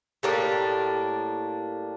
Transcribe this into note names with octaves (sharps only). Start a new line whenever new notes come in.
A2 G3 A#3 D4